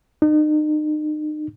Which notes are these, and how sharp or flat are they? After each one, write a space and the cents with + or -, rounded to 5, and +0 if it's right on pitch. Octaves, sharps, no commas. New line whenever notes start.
D#4 -35